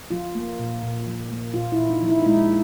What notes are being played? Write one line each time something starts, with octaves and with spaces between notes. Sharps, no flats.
F3 F4
A#3
A#2
A#2
F3
A#3
A#2 F4
E4
A#2
D#4
F3
E4
D#4
G#3 E4